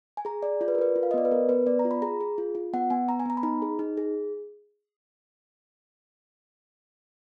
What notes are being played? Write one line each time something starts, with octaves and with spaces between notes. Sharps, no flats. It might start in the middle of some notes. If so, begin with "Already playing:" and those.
G#5
G#4 A#5
G#4 D5
F4 D5
B4
A#4
F4 B4
F4
F5
D#5
B3 D5
B4
B3 A#4
B3 B4
B3 D5
A#5
F4
B5
G#4 A#5
G#4
F4
F4
B3 F#5
B3 G#5
B3 A#5
G#5
B3 A#5
B5
D#4 A#5
G#4
D#4
G#4